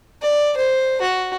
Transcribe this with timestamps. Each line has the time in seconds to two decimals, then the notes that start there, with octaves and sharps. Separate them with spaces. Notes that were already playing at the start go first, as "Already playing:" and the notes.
0.22 D5
0.57 C5
1.01 F#4